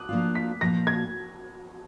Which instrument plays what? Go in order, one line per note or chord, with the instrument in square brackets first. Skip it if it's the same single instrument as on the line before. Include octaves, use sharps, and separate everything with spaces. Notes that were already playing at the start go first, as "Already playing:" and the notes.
Already playing: [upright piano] D6 D#6 F#6
[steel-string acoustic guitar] F3 A#3 D4 F4
[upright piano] B6
[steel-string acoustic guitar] A#2 F3 A#3 D#4 [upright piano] A#6
[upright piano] G#6